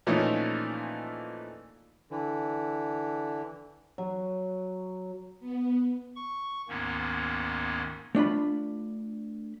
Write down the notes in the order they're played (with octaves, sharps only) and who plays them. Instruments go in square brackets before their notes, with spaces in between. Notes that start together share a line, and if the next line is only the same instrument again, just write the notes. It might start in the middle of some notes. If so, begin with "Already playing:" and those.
[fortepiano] A#2 E3 F3 A3 C#4 D#4
[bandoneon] D3 E3
[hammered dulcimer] F#3
[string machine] B3
[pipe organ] C#6
D2 G#2 D#3 A#3 B3 C#4
[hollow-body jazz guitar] A3 D4 F4 B5